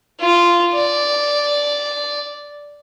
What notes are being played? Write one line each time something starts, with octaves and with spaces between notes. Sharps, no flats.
F4
D5